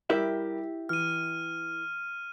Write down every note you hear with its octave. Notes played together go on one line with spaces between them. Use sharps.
G3 E4 G4 A#4 E5
E3 F6 D#7